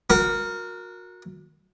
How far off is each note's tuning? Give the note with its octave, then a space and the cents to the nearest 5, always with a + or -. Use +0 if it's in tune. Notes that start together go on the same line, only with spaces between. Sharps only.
F#4 -30 A#4 +0